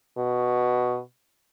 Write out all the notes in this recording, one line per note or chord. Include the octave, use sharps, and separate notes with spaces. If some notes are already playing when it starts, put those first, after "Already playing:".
B2